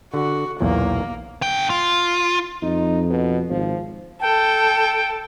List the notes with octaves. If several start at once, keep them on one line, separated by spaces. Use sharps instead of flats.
D3 F#4
B1 E2 A#2 A#3
D3 G5
F4
F2 D#4
B2
G#1 F3
A4 G5